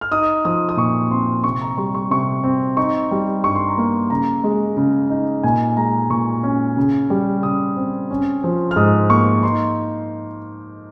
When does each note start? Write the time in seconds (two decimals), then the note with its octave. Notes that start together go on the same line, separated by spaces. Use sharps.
0.01 F6
0.11 D#4 D#6
0.45 F3 D#6
0.69 D#6
0.77 A#2 C#6
1.10 C4 C6
1.44 C3 C#6
1.61 A#5
1.77 G3 C#6
1.95 C#6
2.11 C3 C#6
2.44 C4
2.77 D#4 C#6
3.11 G3
3.44 G2 C#6
3.55 C6
3.68 A#5
3.78 A#3 C6
4.10 C#3 A#5
4.44 G#3
4.77 C#3
5.10 D#4
5.43 A#2 G#5
5.77 G#3 A#5
6.10 A#2 C#6
6.43 C#4
6.77 C#3
7.10 G3
7.43 C#3 D#6
7.77 C4
8.11 C#4
8.44 F3
8.71 F6
8.76 G#2 D#6
9.10 A#3 C#6
9.43 D#4 C6